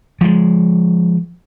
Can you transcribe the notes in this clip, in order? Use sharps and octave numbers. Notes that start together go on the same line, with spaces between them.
F3 G#3